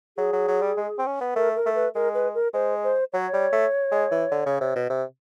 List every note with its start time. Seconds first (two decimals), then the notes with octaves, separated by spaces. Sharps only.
0.17 F#3 G#4
0.33 F#3
0.48 F#3
0.61 G3
0.77 G#3
0.98 C4
1.06 C#4
1.21 B3
1.35 A3 A#4
1.56 A#4
1.66 A3
1.75 B4
1.95 G#3 A#4
2.14 B4
2.35 A#4
2.54 G#3 C5
2.84 C5
3.13 F#3 C#5
3.33 G3
3.52 A3
3.92 G#3
4.11 E3
4.31 D3
4.46 C#3
4.60 C3
4.76 B2
4.90 C3